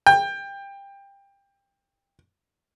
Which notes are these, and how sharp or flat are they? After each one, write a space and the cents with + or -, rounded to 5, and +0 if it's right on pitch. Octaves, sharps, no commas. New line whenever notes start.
G5 +20